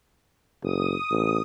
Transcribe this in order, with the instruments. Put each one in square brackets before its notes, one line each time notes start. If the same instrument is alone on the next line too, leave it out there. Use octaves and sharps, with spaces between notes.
[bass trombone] F#1 [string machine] D#6
[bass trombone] A1